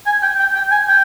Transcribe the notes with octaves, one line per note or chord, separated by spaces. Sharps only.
G#5
G5
G5
G5
G#5
G5